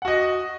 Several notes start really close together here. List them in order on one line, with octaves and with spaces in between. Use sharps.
F#5 F#4 D#5